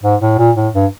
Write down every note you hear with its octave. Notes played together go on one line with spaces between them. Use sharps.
G#2
A2
A#2
A2
G2